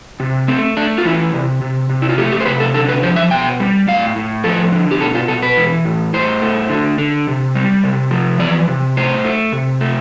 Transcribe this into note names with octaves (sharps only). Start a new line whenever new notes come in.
C3
A3 C4
A3 D4
F4
E3 E4
C3
C3
C3
E4
F4
A3 G4
G4
C5
C3 B4
A4
D3 A4
B4
F3 C5
E5
B2 G5
G3
A2 F5
A2
F3 A4
D3
G4
B2 A4
F4
B2 A4
B4
E3
A2
A2 C5
A3
D3
D3
C3
G3
C3
F3
E3 D5
C3
A2 C5
A3
C3
A3